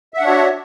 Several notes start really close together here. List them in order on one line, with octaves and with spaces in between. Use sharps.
E5 F#5 D4 C#5 F#4